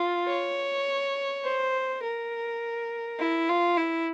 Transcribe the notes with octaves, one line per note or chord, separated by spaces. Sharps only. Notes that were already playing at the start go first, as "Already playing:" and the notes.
Already playing: F4
C#5
C5
A#4
E4
F4
E4